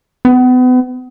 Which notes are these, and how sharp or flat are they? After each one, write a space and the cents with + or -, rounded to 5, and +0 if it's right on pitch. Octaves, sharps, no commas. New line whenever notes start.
B3 +35